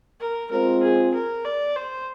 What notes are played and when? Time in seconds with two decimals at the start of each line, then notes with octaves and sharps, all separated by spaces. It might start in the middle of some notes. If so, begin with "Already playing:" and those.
0.20 A#4
0.51 G#3 C4 F4 A#4 C5
0.83 G#4
1.14 A#4
1.45 D5
1.76 C5